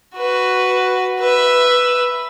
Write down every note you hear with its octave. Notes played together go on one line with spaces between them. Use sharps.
F#4 B4
B4 E5